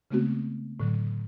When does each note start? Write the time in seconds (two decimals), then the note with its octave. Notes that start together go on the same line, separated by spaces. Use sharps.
0.11 C#3 G#3 A3 B3 C4 F#4
0.80 A2 D3 F#3